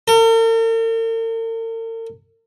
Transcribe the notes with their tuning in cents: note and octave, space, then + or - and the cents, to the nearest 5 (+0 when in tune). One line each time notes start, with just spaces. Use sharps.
A#4 -45